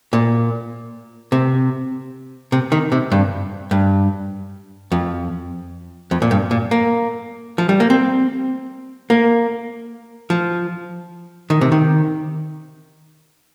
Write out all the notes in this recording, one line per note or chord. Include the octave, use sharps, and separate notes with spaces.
A#2
C3
C3
D#3
C3
G2
G2
F2
F2
A#2
G2
A#2
A#3
F3
G3
A#3
C4
A#3
F3
D#3
C3
D#3